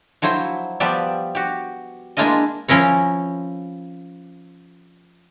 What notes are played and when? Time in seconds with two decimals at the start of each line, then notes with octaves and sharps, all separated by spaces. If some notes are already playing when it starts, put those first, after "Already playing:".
0.22 F3 F#3 E4 C5
0.80 F3 G3 B3 G4 D5 E5
1.35 F#4 G4
2.17 G#3 A#3 D4 E4 F4 D#5
2.68 F3 C#4 E4 A#4 C#5